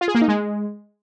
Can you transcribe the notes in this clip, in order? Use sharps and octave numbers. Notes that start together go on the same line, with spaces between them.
F4
G#4
A#3
D#4
G#3